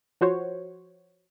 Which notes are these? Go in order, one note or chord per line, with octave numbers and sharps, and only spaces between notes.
F3 F#4 C5 C#5